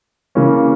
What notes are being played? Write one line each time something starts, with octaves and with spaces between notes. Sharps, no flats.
C#3 E3 A#3 C#4